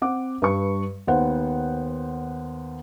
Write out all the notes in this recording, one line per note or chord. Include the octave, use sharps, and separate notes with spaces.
C4 F#5 D6
G2 B4 C#6
D#2 B3 C5 F#5